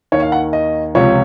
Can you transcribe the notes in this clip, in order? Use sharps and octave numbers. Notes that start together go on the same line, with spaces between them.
D#2 D#3 C#5
F5
F#5
D#5
C#2 C3 F3 C#5